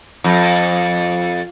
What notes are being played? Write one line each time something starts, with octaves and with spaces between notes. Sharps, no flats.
F2